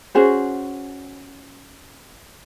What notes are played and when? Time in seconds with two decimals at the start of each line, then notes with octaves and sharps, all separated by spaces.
0.15 C#4 F#4 G#4 C5